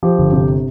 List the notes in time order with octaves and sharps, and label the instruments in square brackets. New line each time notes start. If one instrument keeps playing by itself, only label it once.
[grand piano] F3 G4
G1
C3 G4